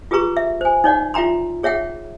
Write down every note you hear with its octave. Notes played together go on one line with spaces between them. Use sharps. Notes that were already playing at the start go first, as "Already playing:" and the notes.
F4 G4 G#4 B4 A#5 C#6
E5
C5 G#5
D#4 C#5 D5 F#5
F4 E5 G5 A#5 C6
G#4 C#5 E5 F#5 G5